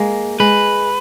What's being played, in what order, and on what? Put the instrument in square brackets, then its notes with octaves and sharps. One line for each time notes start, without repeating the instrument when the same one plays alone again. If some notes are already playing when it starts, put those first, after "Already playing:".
Already playing: [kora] G#3 A#3
[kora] G#3 [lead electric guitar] B4